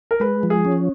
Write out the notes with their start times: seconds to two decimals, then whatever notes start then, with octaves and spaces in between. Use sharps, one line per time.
0.11 A#4
0.20 G#3 B4
0.43 F3
0.50 G#4
0.65 C#4